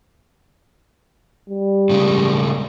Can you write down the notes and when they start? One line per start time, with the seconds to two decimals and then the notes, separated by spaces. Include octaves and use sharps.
1.49 G3
1.90 A2 C#3 G#3